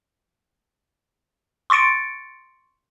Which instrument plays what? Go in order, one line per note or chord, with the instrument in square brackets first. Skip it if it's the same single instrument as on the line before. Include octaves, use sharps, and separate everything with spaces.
[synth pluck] C6 C#6 A6 C#7 D7